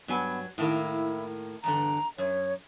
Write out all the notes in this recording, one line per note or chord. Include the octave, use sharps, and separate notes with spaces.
G2 F#3 B3 G#5
A2 D#3 A#3 E4
E2 G2 D3 A#5
F#2 C#5